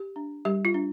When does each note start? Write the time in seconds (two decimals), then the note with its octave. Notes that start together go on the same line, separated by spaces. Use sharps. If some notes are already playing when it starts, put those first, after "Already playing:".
Already playing: G4
0.16 D4
0.45 G3 G4
0.65 F4
0.74 D4